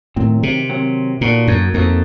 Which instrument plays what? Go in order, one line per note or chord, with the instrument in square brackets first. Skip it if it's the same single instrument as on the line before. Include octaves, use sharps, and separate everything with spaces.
[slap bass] A2 [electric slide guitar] D#3 F#3 C4
[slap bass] C3
[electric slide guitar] D#3 F#3 C4
[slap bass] A#2 [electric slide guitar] A#3 D#4 F#4 A4
[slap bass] F#2
[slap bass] F2 [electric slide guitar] A#3 D#4 F#4 A4